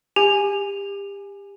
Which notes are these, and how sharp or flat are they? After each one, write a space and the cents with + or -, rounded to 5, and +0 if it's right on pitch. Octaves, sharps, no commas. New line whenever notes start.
G4 +30 G#5 +0